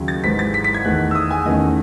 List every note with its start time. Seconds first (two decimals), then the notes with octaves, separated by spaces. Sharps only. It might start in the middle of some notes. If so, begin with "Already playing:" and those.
Already playing: D#2 C#3 F#3
0.08 A6
0.24 G#1 G#2 E3 B6
0.39 A6
0.54 B6
0.64 B6
0.74 G#6
0.85 E2 D#3 A3 F#6
1.11 E6
1.15 D#6
1.31 G#5
1.46 E2 D#3 A3 C#4 D#5